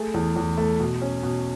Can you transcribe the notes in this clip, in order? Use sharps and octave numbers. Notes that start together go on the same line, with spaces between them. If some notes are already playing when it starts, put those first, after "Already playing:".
Already playing: A3 G#4
E2
E2
A3
B2
C#4
B2